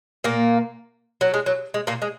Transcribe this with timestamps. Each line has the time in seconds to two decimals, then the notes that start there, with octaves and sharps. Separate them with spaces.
0.24 A#2 A#3
1.21 F#3
1.34 G#3
1.46 F#3
1.74 G#3
1.87 A#2 A#3
2.02 G#3